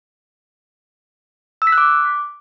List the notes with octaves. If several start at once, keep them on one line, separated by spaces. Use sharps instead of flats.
E6
B6
F#6
D6